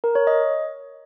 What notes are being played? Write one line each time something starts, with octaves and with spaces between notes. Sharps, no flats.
A#4
C#5
D#5